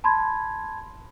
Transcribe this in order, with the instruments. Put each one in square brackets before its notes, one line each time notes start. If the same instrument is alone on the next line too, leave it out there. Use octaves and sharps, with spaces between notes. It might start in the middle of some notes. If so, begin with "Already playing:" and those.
[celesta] A5 B5 C6 G#6